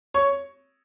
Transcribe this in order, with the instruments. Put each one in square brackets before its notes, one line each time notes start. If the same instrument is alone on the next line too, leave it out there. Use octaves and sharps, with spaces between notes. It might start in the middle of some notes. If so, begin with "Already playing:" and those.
[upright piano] C#5 C#6